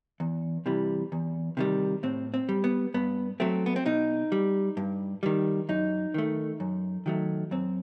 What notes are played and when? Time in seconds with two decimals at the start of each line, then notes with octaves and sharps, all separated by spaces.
0.20 E2
0.66 C3 E3 G3
1.12 E2
1.57 C3 D#3 G3
2.03 A2 C4
2.34 C4
2.49 G3
2.64 B3
2.94 G2 B3
3.40 F#3 A3 C4
3.66 B3
3.76 C4
3.86 B2 D#4
4.32 G3
4.77 G2
5.23 D#3 G3
5.69 F#2 D#4
6.14 D#3 A3
6.60 F#2
7.06 D#3 F#3 A3
7.51 F#2 C4